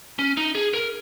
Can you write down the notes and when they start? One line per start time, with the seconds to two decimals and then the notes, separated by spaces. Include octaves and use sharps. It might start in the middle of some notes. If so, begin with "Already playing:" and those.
0.19 C#4
0.37 D#4
0.55 G#4
0.74 A#4